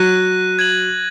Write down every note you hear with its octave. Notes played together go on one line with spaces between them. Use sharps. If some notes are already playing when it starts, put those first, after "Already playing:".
Already playing: F#3 F#6 A#6 D#7
G#6 D#7 F#7